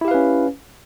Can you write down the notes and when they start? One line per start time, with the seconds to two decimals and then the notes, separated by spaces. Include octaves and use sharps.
0.01 E4
0.05 G4
0.08 F5
0.11 B4
0.14 C#4